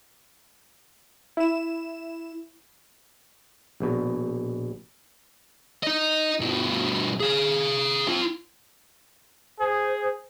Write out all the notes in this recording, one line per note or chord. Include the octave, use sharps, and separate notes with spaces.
E4 E7
A#1 B2
D#4 D#5
G2 B2
G#4 F5
F4 A4
G#4 C5